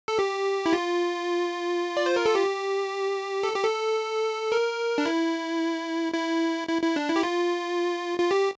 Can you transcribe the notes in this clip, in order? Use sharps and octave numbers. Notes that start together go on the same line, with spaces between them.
A4
G4
E4
F4
D5
C5
A#4
A4
G4
A4
G4
A4
A#4
D4
E4
E4
E4
E4
D4
E4
G4
F4
F4
G4